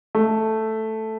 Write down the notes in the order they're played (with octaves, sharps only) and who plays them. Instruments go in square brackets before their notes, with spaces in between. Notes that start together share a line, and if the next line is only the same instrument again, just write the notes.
[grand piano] A3